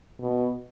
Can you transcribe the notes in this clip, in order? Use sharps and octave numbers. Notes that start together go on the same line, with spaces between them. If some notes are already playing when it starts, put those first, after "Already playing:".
B2